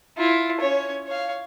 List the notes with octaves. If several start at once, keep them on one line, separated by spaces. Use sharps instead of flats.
E4 F4
C#4 C#5
C#5 F5